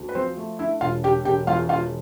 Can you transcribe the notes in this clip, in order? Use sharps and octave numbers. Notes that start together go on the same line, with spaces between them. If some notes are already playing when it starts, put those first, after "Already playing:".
Already playing: D2
B4
F3 C4 C5
A3
D3 E4 E5
E1 F4 F5
D3 G4 G5
E1 G4 G5
E2 F4 F5
E1 F4 F5